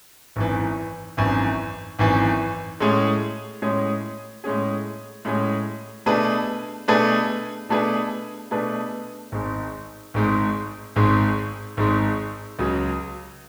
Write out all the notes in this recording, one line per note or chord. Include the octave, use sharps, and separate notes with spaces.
G#1 F#2 E3
G#1 F#2 E3
G#1 F#2 E3
A2 G#3 C#4 G#4
A2 G#3 C#4 G#4
A2 G#3 C#4 G#4
A2 G#3 C#4 G#4
B2 A3 D4 G#4 B4
B2 A3 D4 G#4 B4
B2 A3 D4 G#4 B4
B2 A3 D4 G#4 B4
G#1 G#2 G#3
G#1 G#2 G#3
G#1 G#2 G#3
G#1 G#2 G#3
C#2 C#3 F#3